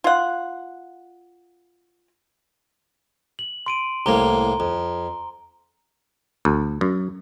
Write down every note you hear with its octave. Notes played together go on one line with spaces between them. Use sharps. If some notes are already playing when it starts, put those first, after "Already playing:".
F4 F#5
F#7
C6 D7 D#7
C2 A2 A#3 A#5 G7
F2
D2
F#2